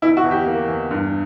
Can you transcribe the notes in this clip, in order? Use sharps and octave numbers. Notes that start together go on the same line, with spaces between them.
E2 E4
F#4
E2
G4
A#3
E2
G2